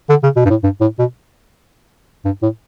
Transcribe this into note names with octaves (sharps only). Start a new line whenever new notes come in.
D3
C#3
B2
G2
A2
G2
A2
B2
G2
A2